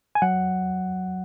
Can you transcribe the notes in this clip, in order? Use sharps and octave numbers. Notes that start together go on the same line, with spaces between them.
G#5
F#3 F#5